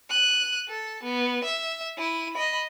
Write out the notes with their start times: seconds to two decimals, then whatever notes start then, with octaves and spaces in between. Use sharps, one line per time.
0.10 F#6 D#7
0.69 A4
1.04 B3
1.44 E5
1.98 E4 D#7
2.34 D#5 B5